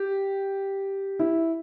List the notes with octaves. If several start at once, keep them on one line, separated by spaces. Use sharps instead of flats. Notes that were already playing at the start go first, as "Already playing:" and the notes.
Already playing: G4
E4